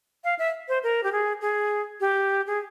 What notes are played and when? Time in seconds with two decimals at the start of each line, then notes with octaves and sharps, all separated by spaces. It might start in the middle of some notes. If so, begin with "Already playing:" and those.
0.24 F5
0.39 E5
0.68 C5
0.83 A#4
1.04 G4
1.12 G#4
1.41 G#4
2.01 G4
2.47 G#4